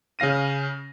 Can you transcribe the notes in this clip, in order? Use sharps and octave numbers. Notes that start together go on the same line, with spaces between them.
C#3 C#4 F5 A#6 D#7